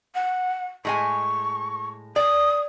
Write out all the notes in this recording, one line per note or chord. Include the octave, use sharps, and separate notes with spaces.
F#5
A2 G#3 G#5 C#6
D5 D#6